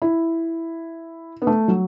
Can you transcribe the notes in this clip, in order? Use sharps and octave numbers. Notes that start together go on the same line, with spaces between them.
E4
B3
A3
F#3